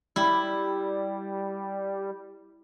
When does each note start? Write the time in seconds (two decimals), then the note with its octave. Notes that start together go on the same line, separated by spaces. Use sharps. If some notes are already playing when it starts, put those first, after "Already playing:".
0.16 G3 E4